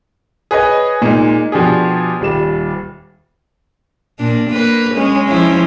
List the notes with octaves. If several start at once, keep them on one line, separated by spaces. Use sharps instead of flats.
G#4 B4 C#5 D#5
A#2 G#3 D#4
B2 F3 D4 G4 G#4
D#1 G3 E7
A#2 D4
A#3 B4
G#3 C#4
F3 C#4 E4